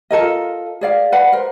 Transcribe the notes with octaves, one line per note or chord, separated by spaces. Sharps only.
F4 A4 A#4 D#5
G#4 D5 F5
B4 D5 F#5 B5
A#4 C5